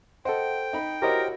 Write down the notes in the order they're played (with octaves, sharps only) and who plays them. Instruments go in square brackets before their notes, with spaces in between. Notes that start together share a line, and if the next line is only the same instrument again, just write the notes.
[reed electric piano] A4 C5 [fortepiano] D#5 F#5 [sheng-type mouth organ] G5
[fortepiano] D#4 B5
[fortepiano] E4 F#4 C#5 [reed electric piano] G4 C5 D#5 [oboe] A#4